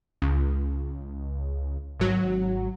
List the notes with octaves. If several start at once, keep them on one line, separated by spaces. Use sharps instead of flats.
C#2
G#1 F#3